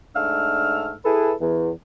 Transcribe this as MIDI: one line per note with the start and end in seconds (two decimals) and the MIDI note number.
0.15 0.94 44
0.15 0.94 57
0.15 0.94 62
0.15 0.94 88
0.15 0.94 89
1.05 1.33 64
1.05 1.33 68
1.05 1.33 69
1.05 1.33 71
1.41 1.69 40